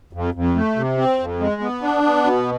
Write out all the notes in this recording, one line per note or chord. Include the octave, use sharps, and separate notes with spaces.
F2
F2
A3
C3
C4
F2
G#3
B3
D4
B3
B2